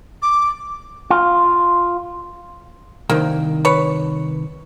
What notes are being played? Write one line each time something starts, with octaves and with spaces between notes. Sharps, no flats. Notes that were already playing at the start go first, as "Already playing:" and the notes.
D6
F4
C2 D#3 A#3
B4 C#5